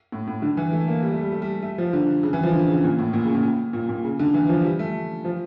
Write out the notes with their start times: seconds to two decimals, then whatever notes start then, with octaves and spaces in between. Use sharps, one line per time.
0.12 A2
0.28 A2
0.42 D3
0.57 E3
0.73 A3
0.88 A#3
1.03 G3
1.12 A3
1.23 G3
1.32 A3
1.42 G3
1.63 A3
1.78 F3
1.93 D3
2.23 C#3
2.33 E3
2.43 F3
2.53 D3
2.68 C#3
2.84 A#2
2.99 A2
3.13 A#2
3.24 C#3
3.35 A#2
3.73 A#2
3.89 A#2
4.04 C#3
4.19 D3
4.34 E3
4.49 F3
4.64 G3
4.79 A3
5.25 F3